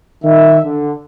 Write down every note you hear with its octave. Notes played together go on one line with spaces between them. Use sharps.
D#3 E5
D3